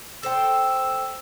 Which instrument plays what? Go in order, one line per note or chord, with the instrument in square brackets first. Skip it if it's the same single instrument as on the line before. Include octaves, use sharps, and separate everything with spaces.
[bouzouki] A4 C5 G5 [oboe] E6